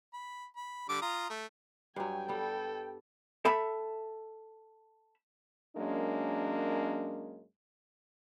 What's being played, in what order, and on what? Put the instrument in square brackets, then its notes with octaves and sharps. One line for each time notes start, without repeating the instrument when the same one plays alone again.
[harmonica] B5
B5
D3 G3 D6
F4 A#5 D#6
A3
[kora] G2 F#3 [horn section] G5 [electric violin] G#5
[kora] G3 B3 [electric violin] A4
[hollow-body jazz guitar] A4 E5 B5
[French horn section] F#2 G#3 A#3 C#4 D4